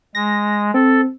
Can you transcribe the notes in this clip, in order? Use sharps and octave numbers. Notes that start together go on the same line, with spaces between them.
G#3 A#6
C4 A4